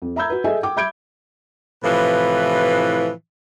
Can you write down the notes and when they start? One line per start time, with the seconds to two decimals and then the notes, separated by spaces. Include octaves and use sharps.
0.02 F2
0.16 E5 A#5 B5 E6 G6 G#6
0.30 F#4 B4
0.44 G#4 A4 D#5 E5 G#5
0.63 G5 D6
0.77 E5 B5 G6 G#6 D7
1.83 A2 C3 E3 F3 B4